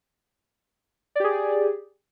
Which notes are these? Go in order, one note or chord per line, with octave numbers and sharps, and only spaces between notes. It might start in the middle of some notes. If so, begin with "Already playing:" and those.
G4 G#4 D5